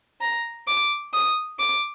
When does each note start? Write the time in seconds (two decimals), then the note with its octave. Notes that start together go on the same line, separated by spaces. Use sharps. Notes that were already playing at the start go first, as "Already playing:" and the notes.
0.21 A#5
0.68 D6
1.14 D#6
1.59 D6